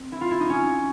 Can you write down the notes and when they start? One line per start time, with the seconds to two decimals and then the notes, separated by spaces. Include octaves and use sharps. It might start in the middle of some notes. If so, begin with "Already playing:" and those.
Already playing: C4
0.12 E4
0.21 F4
0.31 E4
0.40 D#4
0.50 C#4